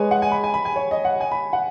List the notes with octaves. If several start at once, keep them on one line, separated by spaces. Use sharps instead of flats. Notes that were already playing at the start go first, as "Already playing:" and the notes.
Already playing: G#3 B4 C#5 G#5
F#5
G#5
B5
G#5
B5
G#5
C#5
D#5
F#5
G#5
B5
F#5